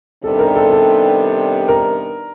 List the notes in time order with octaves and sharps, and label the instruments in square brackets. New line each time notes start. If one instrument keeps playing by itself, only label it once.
[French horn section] C3 D#3 G3 B3 D4 [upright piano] A4
[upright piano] A#4
A4
A4
A#4